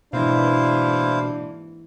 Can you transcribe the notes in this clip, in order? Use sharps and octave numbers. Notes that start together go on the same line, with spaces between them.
G#2 B2 E3 A#3 D4 E4 C5 F5